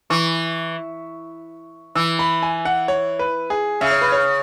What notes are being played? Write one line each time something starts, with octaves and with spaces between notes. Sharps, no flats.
E3 C#6
E3 E6
B5
G#5
F#5
C#5
B4
G#4
C#3 E5
C#5
B4
C#5